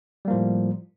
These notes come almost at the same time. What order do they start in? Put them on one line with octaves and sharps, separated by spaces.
G3 A#3 F3 A2